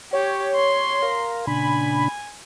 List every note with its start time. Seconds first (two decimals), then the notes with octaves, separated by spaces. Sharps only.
0.13 G4 C#5
0.55 C6
1.02 A#4 F5 A#5
1.47 A#2 C#3 D4 G#5 B5